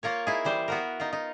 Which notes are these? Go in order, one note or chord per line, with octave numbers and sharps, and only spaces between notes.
A#3 F4 A#4 C#5
D#4 E4 G#4
E3 G3 C5
B3 F#4 A#4
D#4 F4
D#4